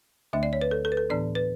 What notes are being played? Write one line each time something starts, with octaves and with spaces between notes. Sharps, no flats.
D2 D3 A3 D4 E5
D5
C#5
B4
A4
A4
B4
A4
A2 E3 B3 D4 D5
B4